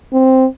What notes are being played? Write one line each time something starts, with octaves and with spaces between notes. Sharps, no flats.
C4